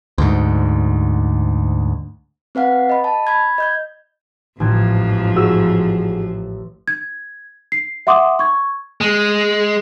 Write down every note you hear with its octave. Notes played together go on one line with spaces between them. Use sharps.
D2 G#2
C4 B4 F5 F#5
D#5 B5
A5
B5 G#6
D#5 G6 G#6
A1 F2 G#2 F3 G#6
F#4 G#4 E6
G#6
C7
E5 F#5 C6 D6 D#6
C#6 G#6
G#3